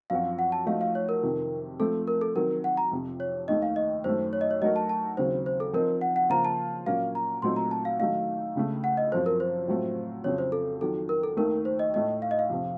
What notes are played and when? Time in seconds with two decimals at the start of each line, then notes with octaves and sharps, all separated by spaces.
0.10 F#2 F3 C4 F#4 F5
0.39 F#5
0.52 A5
0.66 F3 A3 D#4 F#4 A4 F5
0.81 F5
0.95 C#5
1.09 A#4
1.22 F2 C3 D#3
1.79 F3 A3 C4 A4
2.07 A#4
2.21 A4
2.36 D#3 F#3 C4 A#4
2.64 F#5
2.77 A#5
2.91 F2 C3 F3
3.20 C#5
3.48 D#2 D#3 A3 D#5
3.62 F5
3.76 D#5
4.04 F#2 D#3 A3 C5
4.33 C#5
4.41 D#5
4.51 C#5
4.62 F#3 A3 D#4 F#4 A#4 D#5
4.76 A5
4.89 A5
5.17 D#2 C#3 F#3 C4 C5
5.46 C5
5.60 A4
5.73 F3 C4 D#4 A#4
6.01 F#5
6.16 F#5
6.30 C#3 F3 A#3 F4 C5 A#5
6.45 A5
6.86 A#2 F#3 A#3 C#4 F5
7.15 A#5
7.42 A#2 F#3 A3 C4 D#4 C6
7.56 A#5
7.71 A5
7.85 F5
7.99 D#3 F#3 A3 D#4 F5
8.55 C#2 C#3 A3
8.84 F#5
8.97 D#5
9.12 F#2 F3 C4 F4 A4 C5
9.26 A#4
9.40 C5
9.68 A2 F#3 A3 C4 F4
10.24 F2 C#3 F#3 C4 C#5
10.38 C5
10.52 A4
10.81 F2 D#3 F#3 A4
11.09 A#4
11.24 A4
11.37 D#2 D#3 A3 A#4
11.65 C5
11.79 D#5
11.94 A2 A3 D#4 D#5
12.22 F5
12.31 D#5
12.39 F5
12.49 F2 C3 F3